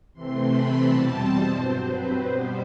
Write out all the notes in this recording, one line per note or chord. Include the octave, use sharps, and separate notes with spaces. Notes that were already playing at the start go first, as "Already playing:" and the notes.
C3 E3 A3 C4 C6
B5
E2 B2 G3 C4 A5
C5
G2 F#3 C4
B4
B2 G3 B3 C5